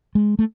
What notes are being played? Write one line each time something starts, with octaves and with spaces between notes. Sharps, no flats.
G#3
A3